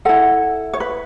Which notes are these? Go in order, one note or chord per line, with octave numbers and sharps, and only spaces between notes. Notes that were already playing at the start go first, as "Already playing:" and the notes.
E4 A4 F#5
C#5
B4